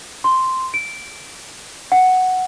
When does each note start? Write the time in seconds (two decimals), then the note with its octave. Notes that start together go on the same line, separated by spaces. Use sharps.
0.24 C6
0.74 D7
1.92 F#5